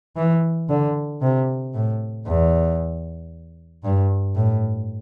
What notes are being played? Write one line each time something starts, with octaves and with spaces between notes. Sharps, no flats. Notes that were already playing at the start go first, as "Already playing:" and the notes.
E3
D3
C3
A2
E2
G2
A2